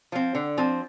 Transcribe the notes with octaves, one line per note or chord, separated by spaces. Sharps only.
F3 C4
D3
F3 C4